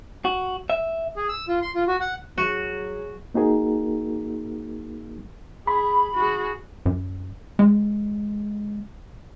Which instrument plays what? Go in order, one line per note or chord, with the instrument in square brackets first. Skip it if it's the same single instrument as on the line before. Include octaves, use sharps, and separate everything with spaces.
[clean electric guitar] F#4
E5
[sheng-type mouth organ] G#4
E6
F4
C6
F4
F#4
F#5
[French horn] F#3 [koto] F#4 [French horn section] G#4
[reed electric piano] A#3 D#4 F#4 G#4 A#4
[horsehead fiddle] G#4 [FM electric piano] B5
[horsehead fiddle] F#4 G#4
[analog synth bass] F#2
G#3